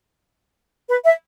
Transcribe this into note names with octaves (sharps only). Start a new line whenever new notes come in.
B4
E5